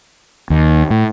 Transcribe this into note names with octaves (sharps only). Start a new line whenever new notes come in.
D#2
A2